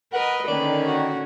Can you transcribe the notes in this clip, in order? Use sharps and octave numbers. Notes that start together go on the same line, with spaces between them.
A#4 B4 D#5 F#5
D3 D#3 A#3 C#4 D5
F#4